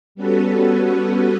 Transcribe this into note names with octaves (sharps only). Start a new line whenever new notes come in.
G3 B3 C#4 F#4 A4 B4